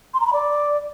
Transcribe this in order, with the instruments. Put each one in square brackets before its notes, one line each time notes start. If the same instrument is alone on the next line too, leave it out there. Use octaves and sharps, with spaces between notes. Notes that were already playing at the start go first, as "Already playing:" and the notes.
[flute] C6
A#5
B5
D5